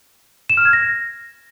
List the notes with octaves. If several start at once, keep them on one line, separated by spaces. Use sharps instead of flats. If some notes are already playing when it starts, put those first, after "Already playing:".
E7
F6
G#6
A#6